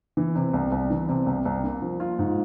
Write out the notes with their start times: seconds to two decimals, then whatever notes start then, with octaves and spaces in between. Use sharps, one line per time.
0.17 E3
0.35 C3
0.53 C2
0.72 C2
0.90 E3
1.09 C3
1.26 C2
1.45 C2
1.63 A#3
1.82 F3
2.00 F4
2.19 G#2